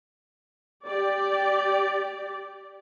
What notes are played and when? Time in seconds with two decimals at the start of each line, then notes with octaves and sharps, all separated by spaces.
0.87 G4 D5